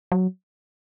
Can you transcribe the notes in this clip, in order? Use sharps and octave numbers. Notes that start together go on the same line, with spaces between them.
F#3